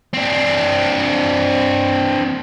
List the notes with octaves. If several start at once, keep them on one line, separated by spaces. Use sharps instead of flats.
C4 D4